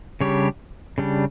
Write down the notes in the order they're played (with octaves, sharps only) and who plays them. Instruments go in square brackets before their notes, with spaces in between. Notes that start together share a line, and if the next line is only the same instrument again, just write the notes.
[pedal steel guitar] C#3 G3 D4 G4 C#5
C#3 G3 D4